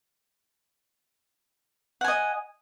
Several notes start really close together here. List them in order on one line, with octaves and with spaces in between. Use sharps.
F#5 G#5 D#5